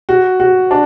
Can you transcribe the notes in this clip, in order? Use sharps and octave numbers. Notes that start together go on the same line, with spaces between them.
F#4
F#4
D4